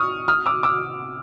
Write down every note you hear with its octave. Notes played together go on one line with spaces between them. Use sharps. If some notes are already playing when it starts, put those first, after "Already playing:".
Already playing: C#6 D#6 F6
D#6 F6
D6 E6
D6 E6